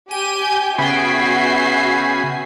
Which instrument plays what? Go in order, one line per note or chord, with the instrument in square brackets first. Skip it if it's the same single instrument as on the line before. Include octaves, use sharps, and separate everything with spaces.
[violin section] G4 G#5 G6 [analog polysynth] D#7
[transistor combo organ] C#3 G#5 B5 [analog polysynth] B3 G5 [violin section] F#4 E5 C7